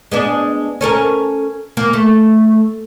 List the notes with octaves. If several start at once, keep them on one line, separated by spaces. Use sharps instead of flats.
G#3 B3 D4
C#4 A4 A#4
A#3
A3